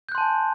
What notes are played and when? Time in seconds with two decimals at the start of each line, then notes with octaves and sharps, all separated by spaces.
0.09 G6
0.12 F#6
0.15 C6
0.18 A5
0.21 G#5